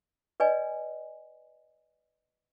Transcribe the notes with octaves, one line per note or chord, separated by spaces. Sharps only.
B4 D5 D#5 G#5